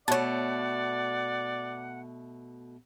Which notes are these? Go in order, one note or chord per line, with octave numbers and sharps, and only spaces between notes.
B2 A3 C#5 D5 F#5 A5